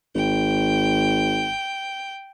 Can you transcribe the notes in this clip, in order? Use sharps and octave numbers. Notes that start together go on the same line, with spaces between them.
G#1 G5